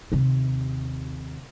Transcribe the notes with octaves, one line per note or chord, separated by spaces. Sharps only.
D#2 C3